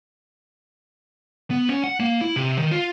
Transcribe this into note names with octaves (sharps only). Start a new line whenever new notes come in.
B3
C#4
F#5
A#3
E4
C3
D#3
F4